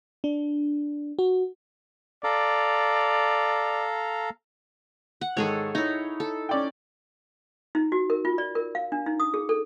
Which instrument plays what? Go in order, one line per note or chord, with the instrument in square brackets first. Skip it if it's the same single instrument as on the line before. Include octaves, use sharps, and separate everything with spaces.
[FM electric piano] D4
F#4
[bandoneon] A4 F5 A#5 [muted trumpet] D5
[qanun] F#5
[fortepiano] G#2 D#3 [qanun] G#4 A4 C#5
[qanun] D#4 E4 [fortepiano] C#5
[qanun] A4
[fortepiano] C#4 D5 G5
[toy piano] D#4
F#4
A#4
F4
D5
A#4
F5
D4
D#4
D#6
G#4
A4